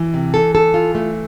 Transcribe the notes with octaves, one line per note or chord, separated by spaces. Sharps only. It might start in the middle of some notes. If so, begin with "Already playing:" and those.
Already playing: E3
C3
A4
A4
F4
A3